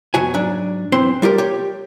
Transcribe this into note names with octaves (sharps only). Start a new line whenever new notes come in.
F2 B2 F#4 G#5
G#2 F#3 D4
B1 E3 C4 C5 C6
G3 F4 G4 A#4
G4 C#5